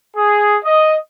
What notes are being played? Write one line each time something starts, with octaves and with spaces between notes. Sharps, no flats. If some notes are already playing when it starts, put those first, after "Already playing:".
G#4
D#5